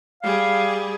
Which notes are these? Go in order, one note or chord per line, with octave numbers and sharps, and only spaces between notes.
G3 G#4 F5